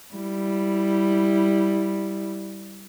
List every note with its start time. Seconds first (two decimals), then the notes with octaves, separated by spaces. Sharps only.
0.14 G3 E4